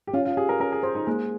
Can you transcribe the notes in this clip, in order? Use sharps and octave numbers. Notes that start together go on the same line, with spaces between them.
G4
C#4 F4
F4
G4 G#4
A#4
C#4 A#4
G#4
G#4 C5
D#4
G#3 A#3